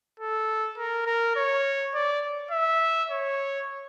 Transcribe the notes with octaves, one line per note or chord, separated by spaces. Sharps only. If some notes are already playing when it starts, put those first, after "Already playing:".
A4
A#4
A#4
C#5
D5
E5
C#5